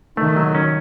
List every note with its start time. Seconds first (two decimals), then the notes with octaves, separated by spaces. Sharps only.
0.17 D#3 A3
0.36 F#3
0.55 C#4